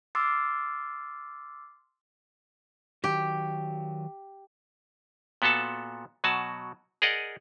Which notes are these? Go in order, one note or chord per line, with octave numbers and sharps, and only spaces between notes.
C6 D6 E6 F6 A6 C7
D#3 F#3 F#4 G4
A#2 B3 F#4 A4 A5
B2 F#3 F#4 A5
G#4 A#4 D5 D#5 F#5